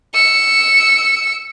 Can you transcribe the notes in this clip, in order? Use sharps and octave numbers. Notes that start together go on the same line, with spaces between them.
E6 C#7